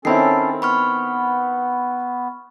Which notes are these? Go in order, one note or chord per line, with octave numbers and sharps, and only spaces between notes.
D#3 C4 C#4 E4 A4 B5 C7
B3 B5 C#6 F6